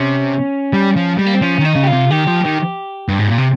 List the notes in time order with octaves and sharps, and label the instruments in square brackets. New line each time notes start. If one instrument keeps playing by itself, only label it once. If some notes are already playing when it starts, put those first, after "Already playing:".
Already playing: [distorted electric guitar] C3 [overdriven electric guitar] C#4
[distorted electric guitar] G3
F3
[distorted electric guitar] G3 [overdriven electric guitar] G#3
[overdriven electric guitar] A#3
C4
[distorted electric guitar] F3 [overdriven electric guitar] C#4
[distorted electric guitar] D#3
[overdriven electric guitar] D#4
[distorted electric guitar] C#3
[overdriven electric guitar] G4
F4
[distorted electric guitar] C3
[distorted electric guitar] D#3 [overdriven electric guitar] G4
[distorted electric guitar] F3
D#3
G2
G#2
A#2
C3